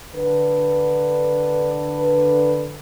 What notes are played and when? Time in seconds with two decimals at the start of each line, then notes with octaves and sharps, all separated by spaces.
0.14 D3 B4